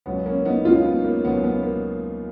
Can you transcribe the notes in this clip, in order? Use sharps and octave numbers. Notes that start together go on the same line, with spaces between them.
C#2 B2 F#3 B3
A#3 C#4
B3 D#4
C#2 B2 F#3 C#4 F4
B3 D#4
A#3
C#2 B2 F#3 B3
B3
A#3